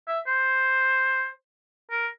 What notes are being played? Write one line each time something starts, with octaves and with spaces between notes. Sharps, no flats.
E5
C5
A#4